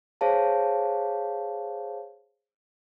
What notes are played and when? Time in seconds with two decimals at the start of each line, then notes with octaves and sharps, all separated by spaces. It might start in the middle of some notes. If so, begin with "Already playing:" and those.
0.21 G#4 C5 C#5 F5 A5